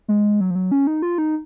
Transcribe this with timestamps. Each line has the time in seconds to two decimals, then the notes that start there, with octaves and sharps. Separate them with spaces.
0.08 G#3
0.41 F#3
0.51 F3
0.55 F#3
0.72 C#4
0.87 D#4
1.02 F4
1.18 D#4